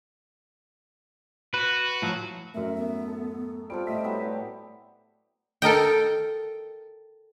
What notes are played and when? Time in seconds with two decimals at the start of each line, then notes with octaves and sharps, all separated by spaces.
1.54 F#4 B4
2.02 A2 F3 F#3
2.54 F#2 A2 A#4 E5
2.76 B3
3.07 A4
3.70 G3 C4 F4 A4 D7
3.87 A2 D#5 E5 B6
4.04 F#3 G3 B3 E4
5.62 A4 A#4 D#5 G5